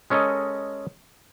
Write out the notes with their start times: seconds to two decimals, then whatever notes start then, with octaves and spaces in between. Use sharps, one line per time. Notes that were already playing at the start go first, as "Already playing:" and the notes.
0.10 G#3 C#4 A4 A#4 D#5